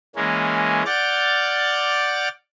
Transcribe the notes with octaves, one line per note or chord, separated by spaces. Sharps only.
E3 G#3 A#3 C#4
D5 F#5 D6 F6 G6 A6